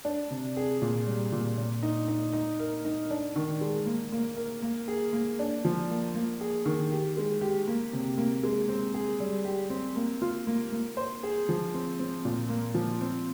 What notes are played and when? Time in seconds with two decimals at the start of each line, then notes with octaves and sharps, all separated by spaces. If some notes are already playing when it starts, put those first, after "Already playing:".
0.05 D4
0.31 C3
0.57 G#4
0.82 A#2
1.06 G3
1.32 A#2
1.57 A#2
1.83 D#4
2.08 D#4
2.33 D#4
2.59 A#4
2.85 D#4
3.11 D4
3.36 D#3
3.61 G#3
3.86 A#3
4.12 A#3
4.36 A#4
4.62 A#3
4.88 G#4
5.13 A#3
5.39 D4
5.65 F3
5.90 A#3
6.14 A#3
6.41 G#4
6.66 D#3
6.92 G4
7.17 G#3
7.41 G4
7.68 A#3
7.93 C3
8.18 A#3
8.44 G#3
8.69 C4
8.94 G#4
9.20 G3
9.45 G4
9.70 C4
9.96 A#3
10.22 F4
10.47 A#3
10.72 A#3
10.97 C5
11.23 G#4
11.49 F3
11.74 C4
11.99 C4
12.25 A#2
12.49 A#3
12.75 F3
13.01 C4